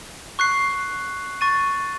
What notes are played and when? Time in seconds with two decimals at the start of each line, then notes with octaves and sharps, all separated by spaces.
0.39 C#6 F#6 C7
1.41 C#6 A6 D#7